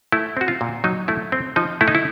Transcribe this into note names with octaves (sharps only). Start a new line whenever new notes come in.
A3 E4
C4 F#4
F4
A#2
F#3 D#4
A3 E4
C4
F3 D#4
A3 E4
D#4
E4